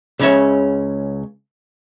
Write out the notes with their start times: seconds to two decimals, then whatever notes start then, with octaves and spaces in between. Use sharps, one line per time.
0.19 C#2 C#3 C#4 C#5 E5